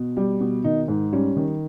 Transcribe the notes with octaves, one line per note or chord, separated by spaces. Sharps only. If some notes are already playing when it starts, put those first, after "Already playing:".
Already playing: B2
G3
B2
D#3 D#4
G#2
G3 C#4
D#3